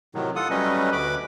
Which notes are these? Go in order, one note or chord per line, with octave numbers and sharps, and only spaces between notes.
A2 C3 D#3 F#3
F4 A4 F#5 D#6
F#3 G3 A3 C#4 B4 D#5
D2 B4 B5 D6